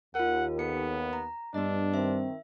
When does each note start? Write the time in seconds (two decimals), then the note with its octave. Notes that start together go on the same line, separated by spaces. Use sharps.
0.15 D#2 F4 A#4 F#5
0.59 B3 A4 C#7
1.13 A#5
1.54 G2 B3 D4 D#5
1.94 D#3 C4 E5